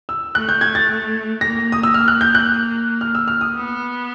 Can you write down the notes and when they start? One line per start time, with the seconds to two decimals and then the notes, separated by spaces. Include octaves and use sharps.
0.09 E6
0.35 A3 F#6
0.49 G6
0.61 G#6
0.75 A6
1.41 A#3 A#6
1.72 D#6
1.83 E6
1.94 A#3 F6
2.08 F#6
2.21 G6
2.35 F#6
3.01 F6
3.15 E6
3.28 F6
3.41 D#6
3.55 B3